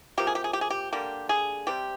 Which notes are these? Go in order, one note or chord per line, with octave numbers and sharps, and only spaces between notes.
C3 F3 A#3 G4
G#4
G4
G#4
G4
G#4
G4
D3 G3 A#3 G4
G#4
C3 G3 C4 G4